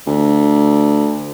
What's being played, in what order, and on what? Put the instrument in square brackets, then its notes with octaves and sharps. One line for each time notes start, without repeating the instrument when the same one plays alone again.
[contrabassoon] D2